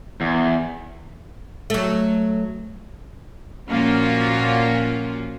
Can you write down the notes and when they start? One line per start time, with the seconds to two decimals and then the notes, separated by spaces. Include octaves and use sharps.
0.21 E2
1.70 F#3 A3
3.70 A#2 F3 A#3 C#4 F4 F#4